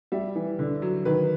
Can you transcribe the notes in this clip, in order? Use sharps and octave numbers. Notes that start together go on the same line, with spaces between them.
G3 E5
E3
D3
F#3
D#3 B4